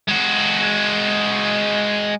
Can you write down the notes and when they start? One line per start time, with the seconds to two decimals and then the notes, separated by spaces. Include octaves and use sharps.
0.09 G#3 F#4